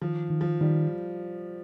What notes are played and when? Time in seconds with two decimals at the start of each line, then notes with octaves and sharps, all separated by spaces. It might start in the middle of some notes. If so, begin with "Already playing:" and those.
0.01 D#3 F3
0.30 D#3
0.41 F3
0.61 D#3 G3